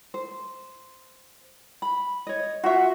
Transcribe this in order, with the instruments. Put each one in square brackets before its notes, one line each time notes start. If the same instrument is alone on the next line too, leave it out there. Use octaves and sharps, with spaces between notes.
[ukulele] C5
B5
C#5 D#5
[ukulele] F4 E5 [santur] F#4